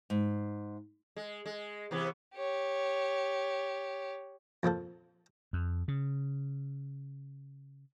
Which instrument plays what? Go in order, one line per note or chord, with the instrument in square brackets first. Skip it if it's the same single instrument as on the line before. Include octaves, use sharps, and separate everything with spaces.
[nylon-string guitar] G#2
[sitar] G#3
G#3
C3 E3 B3
[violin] G4 C#5
[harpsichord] F2 A#2 F3 A4
[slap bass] F2
C#3